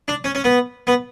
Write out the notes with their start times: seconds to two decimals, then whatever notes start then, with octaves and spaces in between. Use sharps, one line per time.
0.08 D4
0.24 C#4
0.35 C#4
0.44 B3
0.87 B3